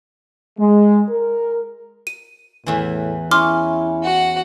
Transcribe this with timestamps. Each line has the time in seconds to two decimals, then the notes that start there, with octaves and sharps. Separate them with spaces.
0.59 G#3
1.10 A#4
2.07 D#7
2.67 E2 A2 E3
3.31 C#4 E4 C6 D6 F6
4.03 F#4 F#5